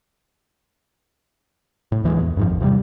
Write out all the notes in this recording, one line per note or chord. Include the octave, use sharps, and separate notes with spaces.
A2
D2 E3 G3 G#3
E2
F2 G#2 F3
G#1 D#2
E2 C3 D#3 G3